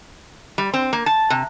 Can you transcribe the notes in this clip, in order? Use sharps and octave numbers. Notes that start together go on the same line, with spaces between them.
G3
C4
A#3
A5
C3